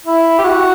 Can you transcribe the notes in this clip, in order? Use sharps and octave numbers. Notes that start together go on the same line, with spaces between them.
E4
G4
F#4